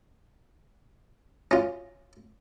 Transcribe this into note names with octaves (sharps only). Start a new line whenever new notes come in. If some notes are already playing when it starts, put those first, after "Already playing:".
C#4 F4